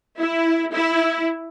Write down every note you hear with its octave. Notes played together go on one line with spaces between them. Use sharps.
E4
E4